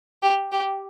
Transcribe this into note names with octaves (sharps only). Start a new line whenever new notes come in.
G4
G4